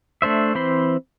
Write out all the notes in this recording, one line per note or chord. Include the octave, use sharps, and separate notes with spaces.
A3 D4 C5 E5
E3 C4 C5 B5 C6